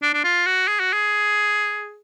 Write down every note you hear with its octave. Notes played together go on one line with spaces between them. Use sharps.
D4
D4
F4
F#4
G#4
F#4
G#4